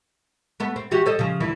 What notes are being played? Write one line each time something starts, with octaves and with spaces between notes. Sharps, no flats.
A3 B3
C4
E3 F#4 G4
A4 C5 D#5
C#3 F3
D2 E3 E4